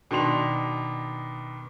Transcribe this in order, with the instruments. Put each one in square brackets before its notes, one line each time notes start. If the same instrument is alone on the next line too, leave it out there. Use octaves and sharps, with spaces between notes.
[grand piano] B2 D#3 D4 C6 F7